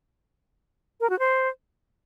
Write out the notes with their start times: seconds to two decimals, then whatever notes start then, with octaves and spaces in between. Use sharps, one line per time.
1.00 A#4
1.10 F#4
1.19 C5